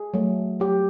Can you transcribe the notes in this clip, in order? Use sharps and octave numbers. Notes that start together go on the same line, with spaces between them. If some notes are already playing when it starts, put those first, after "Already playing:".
Already playing: G#4
F#3 A3
F#3 G4